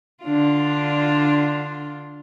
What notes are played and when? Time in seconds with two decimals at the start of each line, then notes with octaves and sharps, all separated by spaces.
0.24 D3 D4 F4